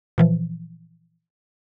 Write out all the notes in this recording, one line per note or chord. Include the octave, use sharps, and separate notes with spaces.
A#2 E3 F3